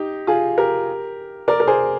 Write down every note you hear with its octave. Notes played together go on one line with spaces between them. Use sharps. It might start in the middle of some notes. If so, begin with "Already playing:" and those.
Already playing: D#4 G4
F4 G#4
G4 A#4
A#4 D5
A#4
G#4 C5